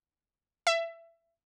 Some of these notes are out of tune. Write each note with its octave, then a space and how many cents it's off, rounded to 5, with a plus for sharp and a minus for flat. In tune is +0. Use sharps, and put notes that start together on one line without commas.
E5 +20